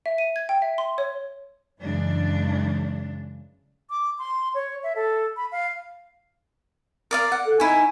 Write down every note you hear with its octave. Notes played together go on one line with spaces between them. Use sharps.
E5
D#7
G#6
G5
E5
C6
C#5
F#2 C#3 E3 G#3 D4
D6
C6
C#5
E5
A4
B5
F5
A#4 D5 F5
F#5
A4
D#4 E4 C#5 G#5